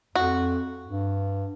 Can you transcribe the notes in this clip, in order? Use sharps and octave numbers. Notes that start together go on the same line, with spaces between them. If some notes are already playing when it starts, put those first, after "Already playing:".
F2 F#4
G2